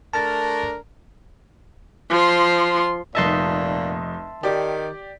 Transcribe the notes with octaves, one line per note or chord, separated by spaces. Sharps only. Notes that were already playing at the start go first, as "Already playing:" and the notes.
A3 D4 A#4 A5 A6
F3 C6
F1 A#2 D#4 D#5 E5 A5 C6
D#3 G4 D5